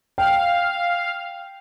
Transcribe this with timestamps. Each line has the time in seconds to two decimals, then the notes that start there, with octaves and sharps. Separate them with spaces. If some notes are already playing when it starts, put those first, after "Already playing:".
0.18 F5 G5